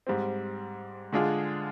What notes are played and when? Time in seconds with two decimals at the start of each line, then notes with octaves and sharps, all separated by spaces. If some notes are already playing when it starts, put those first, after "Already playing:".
0.07 G#2 G3 C4
1.12 D3 G#3 D4 F4 G#4